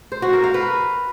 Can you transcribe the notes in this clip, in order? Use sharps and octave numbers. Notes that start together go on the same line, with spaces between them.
C5
F#4
A#4
F5
B4